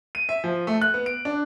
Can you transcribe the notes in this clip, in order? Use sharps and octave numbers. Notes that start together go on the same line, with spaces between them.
D#7
E5
F3
A3
F#6
B3
D7
D4